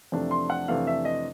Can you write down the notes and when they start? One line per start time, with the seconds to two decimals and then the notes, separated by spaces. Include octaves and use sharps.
0.12 F2 C3 E3 A3 D4
0.31 C6
0.50 F#5
0.68 F2 C3 E3 A3 D4 F5
0.87 E5
1.05 D#5